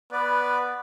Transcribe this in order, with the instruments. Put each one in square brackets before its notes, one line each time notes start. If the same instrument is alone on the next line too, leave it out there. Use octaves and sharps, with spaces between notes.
[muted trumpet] B3 [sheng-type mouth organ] B4 D5